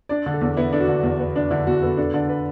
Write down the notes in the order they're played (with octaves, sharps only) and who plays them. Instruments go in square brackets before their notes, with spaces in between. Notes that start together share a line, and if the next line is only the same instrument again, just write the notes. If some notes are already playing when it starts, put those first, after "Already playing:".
[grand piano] D4 D5
D3
A4
E2
B3 E4
D4 A4
F#4
D3
E2
B3
D4
D3 E4
E2 F#4
B3 A4
D4 A4
D3 D5
B4